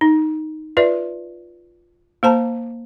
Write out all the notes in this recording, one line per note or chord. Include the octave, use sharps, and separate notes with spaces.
D#4
F4 B4 D5 E5
A#3 C5 A5 A#5